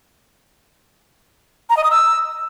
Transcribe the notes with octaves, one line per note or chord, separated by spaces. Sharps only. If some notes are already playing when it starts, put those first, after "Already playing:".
A#5
D#5
D#6
E6